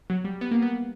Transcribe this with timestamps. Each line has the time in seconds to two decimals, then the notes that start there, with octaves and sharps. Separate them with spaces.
0.10 F#3
0.25 G3
0.41 B3
0.51 A#3
0.62 B3